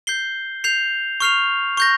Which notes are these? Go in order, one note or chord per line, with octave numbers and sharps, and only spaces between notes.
G6 C7 G7
G6 C7 F7
C#6 F6 C7 F7
C#6 G6 A#6